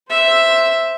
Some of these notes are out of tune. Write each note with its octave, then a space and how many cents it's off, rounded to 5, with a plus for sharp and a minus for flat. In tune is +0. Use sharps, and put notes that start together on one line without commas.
C5 +0 E5 +0